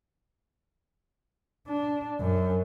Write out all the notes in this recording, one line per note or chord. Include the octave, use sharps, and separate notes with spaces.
D4
F#2